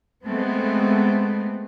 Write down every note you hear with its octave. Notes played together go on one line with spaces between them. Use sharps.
G#3 A3 B3 C4